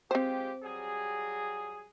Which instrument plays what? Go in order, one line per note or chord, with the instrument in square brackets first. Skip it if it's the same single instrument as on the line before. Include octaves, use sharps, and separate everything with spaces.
[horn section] G#3 F4 G4 [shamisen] C4 C5
[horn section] F#3 G3 G#4